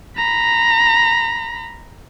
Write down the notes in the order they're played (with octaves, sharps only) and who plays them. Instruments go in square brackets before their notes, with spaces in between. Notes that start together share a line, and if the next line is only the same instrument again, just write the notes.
[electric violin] A#5 B5